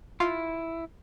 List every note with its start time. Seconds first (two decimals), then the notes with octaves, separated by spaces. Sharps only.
0.20 E4 F4